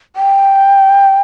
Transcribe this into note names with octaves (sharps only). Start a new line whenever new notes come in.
G5